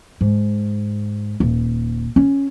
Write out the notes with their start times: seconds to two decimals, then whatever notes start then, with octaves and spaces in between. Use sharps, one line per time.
0.21 G#2
1.40 D#1
2.16 C#4